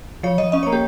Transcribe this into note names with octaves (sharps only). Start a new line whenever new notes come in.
F3 C#5
F3 D#5
C#4 D#5
C#5
A#3
G4